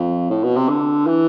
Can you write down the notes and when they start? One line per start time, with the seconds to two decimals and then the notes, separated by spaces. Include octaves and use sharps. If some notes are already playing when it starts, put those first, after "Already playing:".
Already playing: F2
0.30 A2
0.43 B2
0.56 C3
0.69 D3
1.06 E3